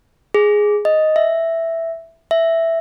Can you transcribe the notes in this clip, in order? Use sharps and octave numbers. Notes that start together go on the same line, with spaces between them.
G#4
D#5
E5
E5